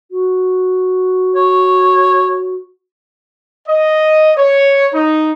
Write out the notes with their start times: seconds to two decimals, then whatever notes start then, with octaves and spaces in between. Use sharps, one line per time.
0.11 F#4
1.35 C#5
3.69 D#5
4.37 C#5
4.94 D#4